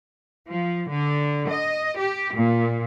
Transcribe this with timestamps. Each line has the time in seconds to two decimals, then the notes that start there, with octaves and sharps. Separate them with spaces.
0.49 F3
0.89 D3
1.49 D#5
1.98 G4
2.35 A#2